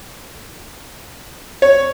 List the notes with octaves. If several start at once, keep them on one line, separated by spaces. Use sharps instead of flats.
C#5